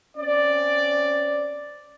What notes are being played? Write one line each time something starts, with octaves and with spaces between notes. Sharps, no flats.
C4 C#4 D5